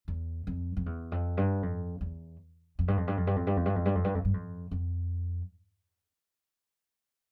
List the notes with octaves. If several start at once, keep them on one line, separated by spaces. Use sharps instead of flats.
E2
F2
F2
E2
F2
G2
F2
E2
F2
G2
F2
G2
F2
G2
F2
G2
F2
G2
F2
G2
F2
G2
F2
G2
F2
F2